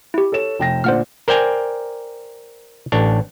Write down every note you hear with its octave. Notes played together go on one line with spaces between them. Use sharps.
E4 G4
A4 C#5 E7
F1 G5 A#6
A#2 D3 D4 C5 F#5 F6
A#4 C5 D5 G5 G#5 A#5
A1 D4 C#5